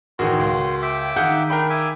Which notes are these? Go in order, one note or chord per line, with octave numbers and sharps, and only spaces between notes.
A1 D#3 F#4 G#4 A#4 C6
C#2 A#4
E5 G5 D6
D#3 G#4 F5 F#5 G6
D4 D#4 A#4 G5 B5
E5 G#5 D6